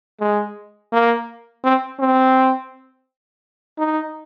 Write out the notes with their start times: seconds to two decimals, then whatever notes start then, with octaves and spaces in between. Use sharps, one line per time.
0.20 G#3
0.93 A#3
1.64 C4
1.99 C4
3.78 D#4